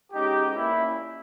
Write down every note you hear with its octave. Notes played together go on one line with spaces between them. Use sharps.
B2 G#3 C#4 D#4 G4
A#2 A#3 C#4 E4